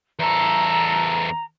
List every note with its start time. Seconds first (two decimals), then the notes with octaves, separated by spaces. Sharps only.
0.19 E2 A4 A#5